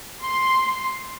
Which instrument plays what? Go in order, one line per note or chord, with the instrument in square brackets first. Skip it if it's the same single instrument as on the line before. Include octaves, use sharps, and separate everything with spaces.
[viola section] C6